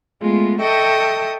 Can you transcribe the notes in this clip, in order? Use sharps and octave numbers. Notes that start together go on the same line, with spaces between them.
G#3 A3 B3 F4
A4 D#5 E5 G5 C#6 D#6